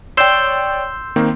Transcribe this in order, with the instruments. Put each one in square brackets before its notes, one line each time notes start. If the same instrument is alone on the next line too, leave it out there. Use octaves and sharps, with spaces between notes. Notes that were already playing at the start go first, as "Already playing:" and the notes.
[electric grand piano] C#5 D5 G5 [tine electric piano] C6 E6 G6
[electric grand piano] D#3 A#3 C4